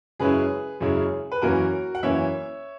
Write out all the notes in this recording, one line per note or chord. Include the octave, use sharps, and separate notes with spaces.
F#2 C#3 G#3 C#4 E4 G#4 B4
F#2 C#3 G#3 C#4 E4 G#4
B4
F#2 E3 A#3 C#4 F#4 A#4
F#5
F#2 E3 A#3 C#4 C#5 E5